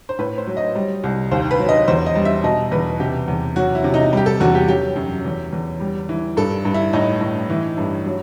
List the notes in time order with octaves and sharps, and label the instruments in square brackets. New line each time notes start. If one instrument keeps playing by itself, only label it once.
[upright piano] C5
A2 B4
C5
F#3
D#5
G3
C2
D#2 C5
B4
F#3
D#5
E2 C5
D#5
G3
E5
B2 D#5
E2 B4
C3 G4
E2
F#3 F#4
E4
C3
D#4
G3 G4
A4
E2 F#4
G4
F#3 G4
F#2
E2
E2
G3
E3
G2 A4
G2
E4
A2 D#4
A2
E3
G2
F#3